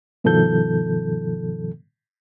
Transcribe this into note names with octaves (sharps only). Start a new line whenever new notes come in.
G2 B2 D#3 F3 A4 G6